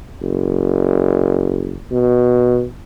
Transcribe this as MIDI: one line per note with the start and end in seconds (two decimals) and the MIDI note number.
0.22 1.79 30
1.91 2.65 47